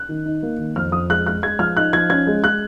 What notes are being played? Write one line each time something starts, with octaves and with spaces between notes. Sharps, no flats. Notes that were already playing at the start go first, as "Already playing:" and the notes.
Already playing: F#6
D#3
D#4
A#3
D#3
F2 F6
F2 D#6
G#3 F#6
G#3 F#6
G#3 G#6
F3 F6
D#4 F#6
F3 G#6
C#4 G#6
G#3
G#3 F#6